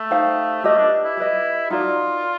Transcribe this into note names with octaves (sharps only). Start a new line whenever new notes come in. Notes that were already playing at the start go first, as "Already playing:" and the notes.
Already playing: A3
D#4 G4 C5 F5
A3 G4 B4 D#5
D4
E4
G4 B4 D#5
D#4 F4 F#4 A#4 D5